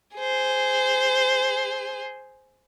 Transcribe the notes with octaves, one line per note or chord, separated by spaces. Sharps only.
G#4 C5